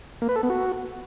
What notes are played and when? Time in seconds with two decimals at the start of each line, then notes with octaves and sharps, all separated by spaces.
0.22 A#3
0.29 B4
0.36 A4
0.43 B3
0.50 F#4